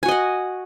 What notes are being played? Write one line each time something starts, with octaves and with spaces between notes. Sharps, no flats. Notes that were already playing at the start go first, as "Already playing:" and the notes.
F#4 D#5 F#5 G#5